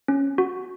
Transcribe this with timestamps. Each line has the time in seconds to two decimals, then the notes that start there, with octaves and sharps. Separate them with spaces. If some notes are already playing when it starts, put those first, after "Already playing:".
0.08 C#4
0.38 F#4